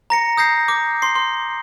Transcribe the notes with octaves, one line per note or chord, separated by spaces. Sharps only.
A#5 A#6 C#7
D#6 G6 A#6 C7
D6
C6 C7
C6